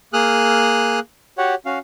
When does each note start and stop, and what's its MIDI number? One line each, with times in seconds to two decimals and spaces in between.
0.13 0.99 58
0.13 0.99 68
0.13 0.99 87
0.13 0.99 89
0.13 0.99 90
1.38 1.55 66
1.38 1.55 67
1.38 1.55 73
1.38 1.55 78
1.66 1.79 61
1.66 1.79 66
1.66 1.79 77